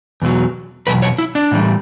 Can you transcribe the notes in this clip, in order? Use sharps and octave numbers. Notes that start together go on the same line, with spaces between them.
E2 B2 F#3
E2 B2 F#3 B4
C#5
E4
D4
A2 E3 G3